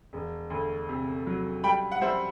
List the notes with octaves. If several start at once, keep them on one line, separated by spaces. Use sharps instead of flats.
E1
D2
C3
F#3
G3 G5 B5
F#5
G3 C5 E5